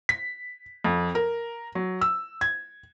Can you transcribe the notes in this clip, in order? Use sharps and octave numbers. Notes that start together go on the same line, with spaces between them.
B6
F2
A#4
F#3
E6
G#6